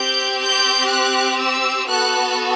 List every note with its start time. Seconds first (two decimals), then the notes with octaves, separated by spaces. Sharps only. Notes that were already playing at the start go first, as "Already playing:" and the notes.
Already playing: C4 G4 G6
0.40 G6
0.90 F#6
1.40 E6
1.89 B3 F#4 A4 F#6